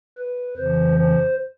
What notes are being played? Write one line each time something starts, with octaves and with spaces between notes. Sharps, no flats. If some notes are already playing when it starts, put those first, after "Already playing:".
B4
F2 C#3 E3 C5
C5